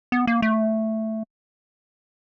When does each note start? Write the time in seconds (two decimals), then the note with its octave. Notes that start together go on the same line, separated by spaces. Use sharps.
0.12 B3
0.27 A#3
0.42 A3